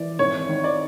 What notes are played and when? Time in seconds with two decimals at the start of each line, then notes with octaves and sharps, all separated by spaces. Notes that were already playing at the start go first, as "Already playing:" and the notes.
Already playing: E3 D5
0.19 G#1 C#5
0.49 D#3
0.64 D5